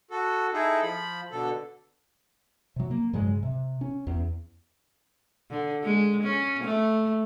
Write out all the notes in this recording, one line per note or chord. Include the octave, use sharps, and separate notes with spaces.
F#4 A4
D#4 E4 G#4 A4
F3 B5
B2 D3 A4
C3 F#3
A#3
G2 C#3 F#3 G#3
C3
C#4
E2
D3
G#3
C#4
A3